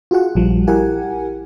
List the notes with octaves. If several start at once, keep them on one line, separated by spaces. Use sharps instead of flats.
F4 F#4 G#4 F#5
A#1 F3 G3
E4 G4 A#4 F#5 G#5